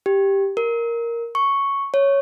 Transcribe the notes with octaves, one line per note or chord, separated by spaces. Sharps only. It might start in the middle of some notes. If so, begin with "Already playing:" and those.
G4
A#4
C#6
C#5